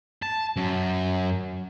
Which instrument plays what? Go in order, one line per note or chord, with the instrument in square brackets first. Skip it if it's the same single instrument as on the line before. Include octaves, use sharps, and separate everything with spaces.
[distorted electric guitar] A5
F#2